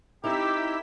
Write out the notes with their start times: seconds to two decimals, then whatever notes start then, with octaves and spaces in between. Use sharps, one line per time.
0.24 C4 D#4 E4 G4 A#4 E6 B6